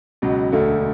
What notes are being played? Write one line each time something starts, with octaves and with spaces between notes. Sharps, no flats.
C#2 B2 F#3
E1 D2 D3 A3